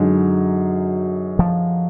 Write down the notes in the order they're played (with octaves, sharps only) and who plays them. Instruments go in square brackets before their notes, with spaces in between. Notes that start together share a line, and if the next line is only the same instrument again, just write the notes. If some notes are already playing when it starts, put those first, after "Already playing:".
Already playing: [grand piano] F#2 D3 G#3 D#4 [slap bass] F#3
[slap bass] F3